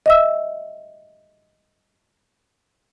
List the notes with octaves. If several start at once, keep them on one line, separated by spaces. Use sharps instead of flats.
D#5 E5 E6